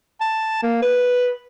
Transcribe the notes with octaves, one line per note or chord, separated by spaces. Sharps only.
A5
A#3
B4